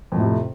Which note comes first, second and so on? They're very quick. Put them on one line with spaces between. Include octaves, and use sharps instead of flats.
F2 A2 C3